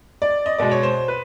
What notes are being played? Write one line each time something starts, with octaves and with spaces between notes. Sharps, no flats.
D5
D#5
B2 G#3 D5
C#5
C5
B4